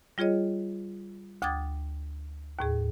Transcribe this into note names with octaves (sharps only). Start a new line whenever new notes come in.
G3 F4 G#4 C#5 D#5
D2 G5 D6 D#6 G#6 A6
D#2 A2 G#4